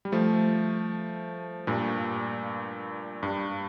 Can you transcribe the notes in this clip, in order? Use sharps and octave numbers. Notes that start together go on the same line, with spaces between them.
G3
F3 A3
G2 A#2
G2